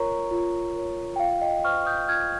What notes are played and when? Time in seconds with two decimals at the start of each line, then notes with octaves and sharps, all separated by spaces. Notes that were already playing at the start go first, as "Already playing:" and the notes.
Already playing: F4 A#4 C#5 A#5 C#6
0.31 F4
0.76 A#4 C#5
1.16 G5
1.19 F4 F5
1.42 D#5 G5
1.64 C5 C#6 F6
1.86 D#6 G6
2.08 F4 F6 G#6